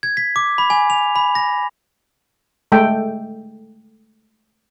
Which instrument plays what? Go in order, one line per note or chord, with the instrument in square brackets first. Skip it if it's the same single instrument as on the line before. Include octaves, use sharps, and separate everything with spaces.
[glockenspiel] G#6
B6
D6
B5
G#5
F7
B5
A#6
[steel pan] G#3 A3 A4 G5